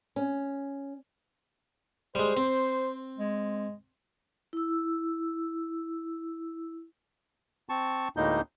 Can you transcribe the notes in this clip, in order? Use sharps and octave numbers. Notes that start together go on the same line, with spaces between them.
C#4
G3 G#3 C5
C4
G#3
E4 E6
C4 A5 C#6
D2 A2 G#3 A#3 D#4 G6